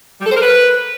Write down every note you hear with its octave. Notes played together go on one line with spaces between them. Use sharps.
G3
A4
C5
A#4
B4